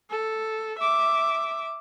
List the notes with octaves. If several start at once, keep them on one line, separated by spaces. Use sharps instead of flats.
A4
E5 D6